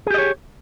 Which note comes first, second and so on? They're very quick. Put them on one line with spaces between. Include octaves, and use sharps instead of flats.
G#4 G4 D#5 C#5